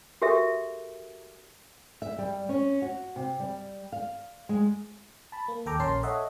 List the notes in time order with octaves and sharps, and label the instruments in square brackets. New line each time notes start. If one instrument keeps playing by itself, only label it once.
[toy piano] F#4 G4 A4 A#4 E5
[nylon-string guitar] E5
G3
C#4
F#4
C3
G3
F5
G#3
[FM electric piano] A5 B5
A#3
D#2 A4 G5 A#5 D6
A#1 C#4 A#4 A5 C6 C7
A4 C#5 D#5 E5 F#5